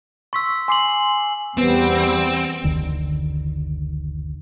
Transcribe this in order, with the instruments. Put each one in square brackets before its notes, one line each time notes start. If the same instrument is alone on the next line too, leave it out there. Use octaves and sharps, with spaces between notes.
[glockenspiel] C6 E6 [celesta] C#6 B6
[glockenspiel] G#5 C7 F#7 [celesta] C6 D6
[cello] E2 [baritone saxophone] G3 [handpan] B3 [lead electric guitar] C4
[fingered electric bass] F#1 D2 D3 D#3